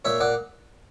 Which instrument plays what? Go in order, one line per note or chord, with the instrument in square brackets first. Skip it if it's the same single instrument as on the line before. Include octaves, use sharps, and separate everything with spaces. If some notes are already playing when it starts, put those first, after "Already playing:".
[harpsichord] A#2 C#5 E5
A#2 D5 F#5